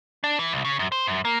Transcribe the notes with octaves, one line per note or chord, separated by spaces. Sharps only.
D4
E3
C2
C#3
F#2
C5
F#2
A#3